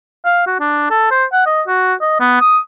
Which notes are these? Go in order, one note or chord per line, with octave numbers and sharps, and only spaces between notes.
F5
F#4
D4
A4
C5
F#5
D#5
F#4
D#5
B3
D#6